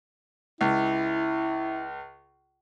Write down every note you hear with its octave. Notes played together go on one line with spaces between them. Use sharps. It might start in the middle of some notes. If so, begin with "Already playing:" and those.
C#2 E4